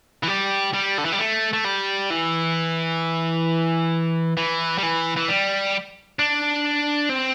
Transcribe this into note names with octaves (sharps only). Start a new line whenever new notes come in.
E3
G3
G3
D3
E3
G3
A3
A3
G3
E3
E3
G3
E3
E3
G3
D4
C4